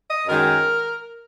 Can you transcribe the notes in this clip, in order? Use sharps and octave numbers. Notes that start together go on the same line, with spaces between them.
D#5
F#2 D#3 G#3 A#4